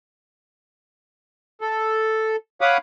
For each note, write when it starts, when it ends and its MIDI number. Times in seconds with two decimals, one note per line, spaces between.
1.61 2.36 69
2.61 2.78 73
2.61 2.78 77
2.61 2.78 78
2.61 2.78 83
2.61 2.78 86
2.61 2.78 87